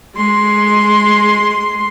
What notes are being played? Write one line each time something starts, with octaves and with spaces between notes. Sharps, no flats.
G#3 C6